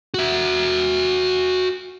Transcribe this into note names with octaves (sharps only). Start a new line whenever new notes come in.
F#4 E5